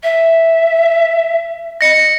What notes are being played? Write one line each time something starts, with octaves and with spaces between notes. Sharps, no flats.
E5
D#5 A#6 C#7